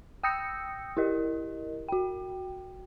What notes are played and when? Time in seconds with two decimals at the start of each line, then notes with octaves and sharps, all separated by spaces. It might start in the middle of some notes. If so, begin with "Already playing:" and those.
0.23 G5 D#6 E6 G6 A#6 C#7
0.97 E4 G4 A#4 D#5
1.89 F#4 G5